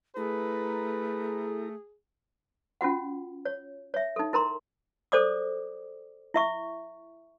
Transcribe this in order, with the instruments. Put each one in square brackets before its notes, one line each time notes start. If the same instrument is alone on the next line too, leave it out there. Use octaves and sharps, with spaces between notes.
[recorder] A3 [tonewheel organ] E4 A4 A#5 [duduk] G#4 [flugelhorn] B4
[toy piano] C#4 F4 F#4 F#5
C#5
C#5 E5
D#4 A4
E4 A#4 A#5 C6
A4 C5 D5 D6 D#6
E4 E5 C#6